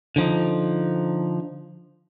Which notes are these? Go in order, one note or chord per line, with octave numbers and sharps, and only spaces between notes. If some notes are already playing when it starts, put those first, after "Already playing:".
D3 F3 D#4